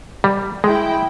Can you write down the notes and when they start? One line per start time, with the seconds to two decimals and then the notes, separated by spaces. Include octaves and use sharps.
0.24 G3
0.64 G#3 E4 G5